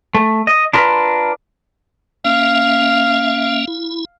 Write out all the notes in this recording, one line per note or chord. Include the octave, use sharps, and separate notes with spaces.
A3
D#5
D4 F4 A#4 B4
A#3 C#4 E5 F5
E4